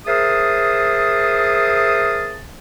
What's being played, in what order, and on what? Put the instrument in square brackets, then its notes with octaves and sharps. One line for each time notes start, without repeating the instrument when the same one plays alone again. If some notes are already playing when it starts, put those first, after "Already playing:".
[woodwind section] G#4 A#4 C5 E5 A5 D#6